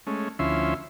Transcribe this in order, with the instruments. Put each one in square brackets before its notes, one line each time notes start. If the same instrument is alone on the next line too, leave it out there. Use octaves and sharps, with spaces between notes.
[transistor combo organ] G#3 A3 C#4
D2 F3 C#4 E4 E5 C6